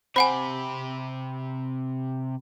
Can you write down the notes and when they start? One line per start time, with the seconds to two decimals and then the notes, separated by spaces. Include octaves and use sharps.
0.16 C3 G4 C5 F#5 G#5 B5